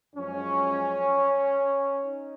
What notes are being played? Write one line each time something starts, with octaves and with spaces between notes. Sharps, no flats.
F#2 F3 G#3 C#4
D#4